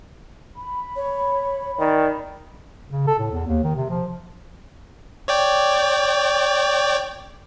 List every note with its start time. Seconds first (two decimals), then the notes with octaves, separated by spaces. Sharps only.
0.56 B5
0.96 C#5
1.79 D#3 D5
2.90 C#3
3.07 A4
3.19 A2
3.31 E2
3.47 D#2
3.64 D#3
3.75 C3
3.90 F3
5.28 C#5 D5 G5